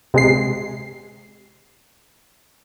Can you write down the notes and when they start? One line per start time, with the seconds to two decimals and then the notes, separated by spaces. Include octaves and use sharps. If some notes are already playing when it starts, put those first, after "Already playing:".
0.14 C3 G#3 C7